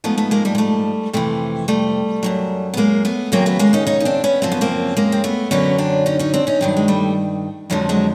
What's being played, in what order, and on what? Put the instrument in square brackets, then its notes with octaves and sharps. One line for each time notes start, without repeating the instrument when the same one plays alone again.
[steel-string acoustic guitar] G#2 F3 A3 B3
A3 B3
G#3 A#3
G3 A3
G#3
G3 A3
F2 C3 E3 G3 A3
G3 A3
F#2 D3 F#3
B3
G#3 A#3
A3 B3
D#2 C#3 F#3 A#3 C4
A3 B3
G#3 A#3
C#4 D#4
C#4 D#4
D#4
C4 D4
B3 C#4
F#2 C#3 F3 C4
B3
A#3 C4
G#3 A#3
C4
A3 B3
F#2 D3 F#3 B3 C#4
C4 D4
C#4 D#4
C#4 D#4
C4 D4
C#4 D#4
G2 D#3 F#3 C4 D4
G#3
G3 A3
F2 D3 F3 F#3 G#3
F#3 G#3